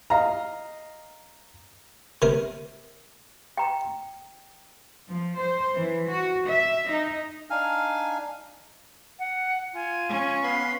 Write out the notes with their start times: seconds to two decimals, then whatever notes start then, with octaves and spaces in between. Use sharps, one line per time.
0.10 D#5 F5 A#5
2.22 C3 A#4
3.58 G5 A#5
5.09 F3
5.39 C5
5.78 E3
6.09 F#4
6.48 E5
6.90 D#4
7.50 D4 D#4 F5 G#5 F6
9.19 F#5
9.74 F4 G#5
10.09 C#4
10.43 B3 F5 B5 C6